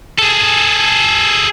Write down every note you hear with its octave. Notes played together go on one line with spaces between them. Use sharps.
G#4 A4